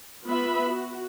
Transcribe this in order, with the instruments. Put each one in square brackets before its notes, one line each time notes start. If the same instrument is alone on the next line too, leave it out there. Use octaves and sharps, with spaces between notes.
[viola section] B3 F4 B4 E5 B5
F#4